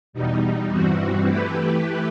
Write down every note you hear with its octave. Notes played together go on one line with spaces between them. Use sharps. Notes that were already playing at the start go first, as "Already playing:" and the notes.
E2 B2 G3 D#4
G2 E3 G3 C4 F#4
E3 A3 E4 G4 B4